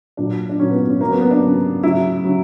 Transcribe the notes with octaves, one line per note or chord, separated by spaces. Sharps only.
A#2 F#3 D4
D4
A#2 F#3 C#4
B3
C#4
C#3 F#3 A#3
B3
B3
D4
C#3 F#3
C#3 F#3 E4
C#3 F#3